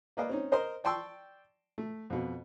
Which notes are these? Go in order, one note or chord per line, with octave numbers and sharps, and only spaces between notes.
A#3 B4 D5 D#5 F5
C4 C#4 D#4
A#4 C5 D#5 A#5 C6
D5 G5 A5 C6 C#6 E6
A3
F2 B2